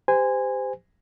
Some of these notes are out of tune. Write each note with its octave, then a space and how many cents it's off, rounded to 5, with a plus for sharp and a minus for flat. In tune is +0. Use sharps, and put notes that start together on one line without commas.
G4 +15 C5 -30 G#5 -15